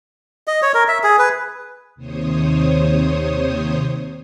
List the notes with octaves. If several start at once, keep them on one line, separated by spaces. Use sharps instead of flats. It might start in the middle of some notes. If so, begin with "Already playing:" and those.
D#5
C#5
A#4
E5
G#4
B4
D#2 C3 C5 C#5 D#6